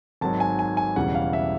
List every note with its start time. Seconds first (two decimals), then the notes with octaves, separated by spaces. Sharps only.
0.21 G#1 G#2 D#3 F#3 A5
0.40 G#5
0.59 G#5
0.77 G#5
0.96 E1 E2 C#3 E3 G3 F#5
1.15 F5
1.33 E5